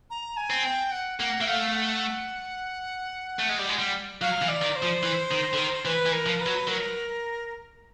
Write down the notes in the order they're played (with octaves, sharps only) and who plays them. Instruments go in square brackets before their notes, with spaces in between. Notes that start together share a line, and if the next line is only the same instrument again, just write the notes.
[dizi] A#5
G#5
[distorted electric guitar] C4
[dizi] G5
F#5
[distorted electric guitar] A#3 [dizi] F#5
[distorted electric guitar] A#3 [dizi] E5
[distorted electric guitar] A3 [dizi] F5
[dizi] F#5
[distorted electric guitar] A3
G#3
G3
G#3
G3
[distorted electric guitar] F#3 [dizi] F5
[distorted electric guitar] E3
[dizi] D5
[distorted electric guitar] D#3
[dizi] C5
[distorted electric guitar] F3
E3
D#3
D3
D#3
[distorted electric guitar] E3 [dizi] B4
[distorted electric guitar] E3
[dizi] A#4
[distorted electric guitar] F3
[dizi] B4
[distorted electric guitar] F#3
[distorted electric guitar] F#3 [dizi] A#4